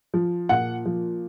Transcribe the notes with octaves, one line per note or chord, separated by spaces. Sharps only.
F3
A#2 F#5
F3